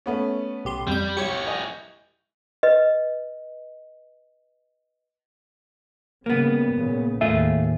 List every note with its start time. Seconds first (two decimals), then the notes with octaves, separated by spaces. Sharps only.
0.06 A3 B3 C#4
0.65 B1 G4 C6
0.87 F2 G3 G6
1.17 E4 G4 C#5 C#6 C#7
1.47 D#5 G#5
2.63 B4 D#5
6.26 C#3 G3 A#3 B3
6.74 A#2 C#3
7.21 D#2 A2 A3 F4 G#4 E5